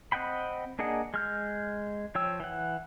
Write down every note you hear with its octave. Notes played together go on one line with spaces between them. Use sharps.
C4 D#5 F#5 G5 B5
A#3 D4 G#4 D#5 F#5
G#3 F6 G6
F3 C#5 G5 E6
E3 F#5